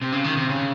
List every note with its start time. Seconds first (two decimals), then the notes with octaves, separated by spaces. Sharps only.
0.02 C3
0.12 C#3
0.24 D#3
0.37 C3
0.49 C#3